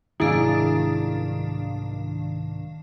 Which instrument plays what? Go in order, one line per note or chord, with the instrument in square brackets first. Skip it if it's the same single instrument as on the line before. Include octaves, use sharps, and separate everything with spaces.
[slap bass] C2 G#2 F#3 [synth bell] D#3 D4 F5 [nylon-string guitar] E4 G#4